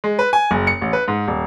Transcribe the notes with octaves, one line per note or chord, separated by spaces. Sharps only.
G#3
B4
G#5
F#1
C#7
A1
B4
G#2
D#1